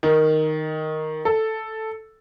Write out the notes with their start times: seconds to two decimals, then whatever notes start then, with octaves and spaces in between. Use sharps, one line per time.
0.03 D#3
1.25 A4